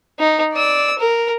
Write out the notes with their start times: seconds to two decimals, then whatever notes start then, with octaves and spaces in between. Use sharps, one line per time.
0.19 D#4
0.53 D5 E6
0.99 A#4